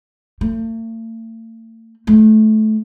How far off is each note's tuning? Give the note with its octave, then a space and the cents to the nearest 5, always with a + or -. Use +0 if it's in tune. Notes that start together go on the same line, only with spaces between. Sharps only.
A3 +45
A3 -20